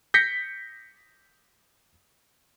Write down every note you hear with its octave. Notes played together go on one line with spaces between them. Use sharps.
G6 A#6 B6 C#7